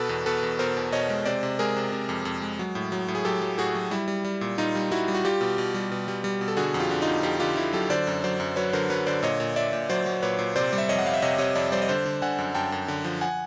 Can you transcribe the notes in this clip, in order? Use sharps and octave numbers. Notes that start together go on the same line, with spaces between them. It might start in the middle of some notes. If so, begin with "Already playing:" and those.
Already playing: B2 A4 B4
E2
B2 A4 B4
E2
B2 A#4 C5
E2
B2 C#5 D#5
G#3
C3 C5 D5
C3
G#3 G#4 A#4
C3
C3
F2
F2
G#3
F#3
A2
F#3
A2
G#4
F#3 G4 A4
F#3
A2 F#4 G#4
F#3
G3 E4
G3
G3
A#2
A#2 D#4 F4
G3
G3 E4 F#4
G3
F#4
G3 F4 G4
B2
B2
G3
B2
G3
G3
B2
A4
D3 F#4 G#4
F2
F4 G4
D3
D#4 F4
F2
F2 F4 G4
D3 F4 G4
D3 E4
F#3 G4 A4
D3 C5 D5
F#2
F#3 C5 D5
F#2
F#3 B4 C#5
D3 A#4 C5
F#3 B4 C#5
D3 C5 D5
A#2 C#5 D#5
A#2
A#2 D5 E5
A#2
F#3 C5 D5
F#3
A#2 B4 C#5
A#2
C3 C5 D5
G3
E5
F2 C#5 D#5
F#5
G3 F5
E5
C3 C#5 D#5
C3 C#5 D#5
F2 D5 E5
G3 C5 D5
D#5
D3 C5 D5
D3
D3 F#5 G#5
F#2
F#2 G5 A5
F#2
D3
F3
F#5 G#5